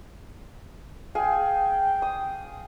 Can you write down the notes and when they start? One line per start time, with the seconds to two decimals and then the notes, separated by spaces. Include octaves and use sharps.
1.15 G#4 F5 G5 G#5
2.02 D#6